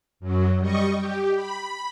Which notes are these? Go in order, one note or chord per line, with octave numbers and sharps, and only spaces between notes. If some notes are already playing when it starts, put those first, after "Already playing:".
F#2 F#3
G3 D#5 C#6
G4
B5